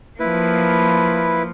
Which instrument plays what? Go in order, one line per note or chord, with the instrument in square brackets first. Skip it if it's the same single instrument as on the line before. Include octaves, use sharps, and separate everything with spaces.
[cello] F3 A#3 [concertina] E4 B4